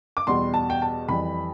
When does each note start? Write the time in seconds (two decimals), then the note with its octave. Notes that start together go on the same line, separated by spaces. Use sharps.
0.17 D6
0.27 E2 B2 G3 C6
0.54 A5
0.70 G5
0.82 A5
1.08 F2 E3 G3 B5